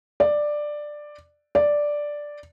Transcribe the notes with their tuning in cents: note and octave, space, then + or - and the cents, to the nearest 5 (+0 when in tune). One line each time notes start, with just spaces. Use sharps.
D5 +10
D5 +0